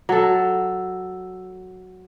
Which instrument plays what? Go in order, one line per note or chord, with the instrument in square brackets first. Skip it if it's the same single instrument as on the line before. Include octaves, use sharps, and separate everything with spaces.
[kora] F#3 A4